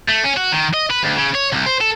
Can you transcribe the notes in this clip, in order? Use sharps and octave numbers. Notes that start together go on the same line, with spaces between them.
A3
C#4
F#4
D#3
D#5
B4
D2
C#3
C#5
C2
C5
A4